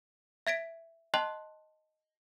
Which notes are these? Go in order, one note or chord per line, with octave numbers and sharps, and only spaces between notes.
E5 G#6 B6 D7
D#5 G5 A5 C6 F#6 F#7